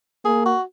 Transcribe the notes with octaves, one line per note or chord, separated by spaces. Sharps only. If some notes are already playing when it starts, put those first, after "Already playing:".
A#3 G#4
F#4